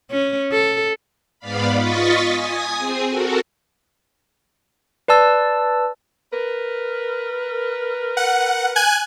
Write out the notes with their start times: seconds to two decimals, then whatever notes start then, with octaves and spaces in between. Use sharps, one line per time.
0.11 C#4
0.52 A4
1.40 G#2 B3 D5 F5 B5
1.74 F4 D#5 C#6 A6 B6
2.31 G#5 D#6
2.77 C4 G#4
3.07 F#4 A4 A#4
5.08 B4 D5 A5 E6 A6
6.33 A#4 B4
8.17 F#5
8.76 G#5 F#6 G#6